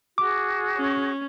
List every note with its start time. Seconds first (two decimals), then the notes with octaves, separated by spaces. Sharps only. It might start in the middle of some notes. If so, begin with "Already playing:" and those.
0.18 F#4 G#4 D6
0.77 C#4